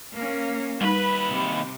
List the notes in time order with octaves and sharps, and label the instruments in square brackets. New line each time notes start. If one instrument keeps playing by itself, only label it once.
[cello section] A#3 C#4
[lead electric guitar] D#2 B5 [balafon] G3 D#4 [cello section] B4
[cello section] C3